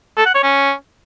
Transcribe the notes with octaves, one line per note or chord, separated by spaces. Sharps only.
A4
F#5
C#5
C#4